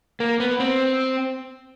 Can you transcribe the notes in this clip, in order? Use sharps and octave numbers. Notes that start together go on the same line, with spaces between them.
A#3
B3
C4